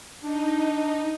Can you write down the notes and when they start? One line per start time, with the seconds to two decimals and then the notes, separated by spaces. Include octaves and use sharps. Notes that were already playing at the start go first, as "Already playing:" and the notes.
0.22 D4 D#4